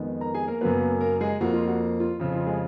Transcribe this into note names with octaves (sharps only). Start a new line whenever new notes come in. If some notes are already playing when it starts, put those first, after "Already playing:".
Already playing: F2 D#3 G#3 B3
A#4 A#5
G#4 G#5
A#3 A#4
F#2 C#3 F#3 A#3 B3 B4
A#3 A#4
G#3 G#4
F2 F3 A#3 F#4
F4
F#4
F4
F2 C#3 F3
F4
G#3 G#4